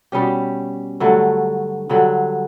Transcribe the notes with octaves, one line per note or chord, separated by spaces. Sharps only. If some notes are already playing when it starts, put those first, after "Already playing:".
B2 G3 C#4 G4
G2 D3 F#3 A3
G2 D3 F#3